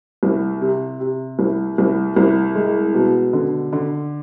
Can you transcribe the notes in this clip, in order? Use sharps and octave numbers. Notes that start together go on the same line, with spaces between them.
C2
C3
C3
C2
C2
C2
G#3
B2
D3
D3